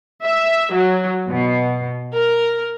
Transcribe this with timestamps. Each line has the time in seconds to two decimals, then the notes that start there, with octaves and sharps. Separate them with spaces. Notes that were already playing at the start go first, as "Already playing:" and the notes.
0.24 E5
0.74 F#3
1.29 B2
2.12 A#4